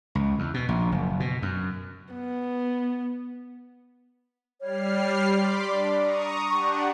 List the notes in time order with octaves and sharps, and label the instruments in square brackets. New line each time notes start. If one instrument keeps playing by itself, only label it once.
[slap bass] C#2
E2
B2
A#1
F#1
B2
F#2
[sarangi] B3
[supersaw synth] G3 F6 C7 [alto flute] C#5
[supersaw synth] B5 C6 D6
[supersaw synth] D4 [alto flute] D5
[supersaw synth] A#5 C#6 D#6
[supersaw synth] D4 G4 F#5 [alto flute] C#6